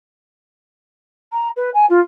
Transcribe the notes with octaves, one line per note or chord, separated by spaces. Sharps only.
A#5
B4
G#5
F4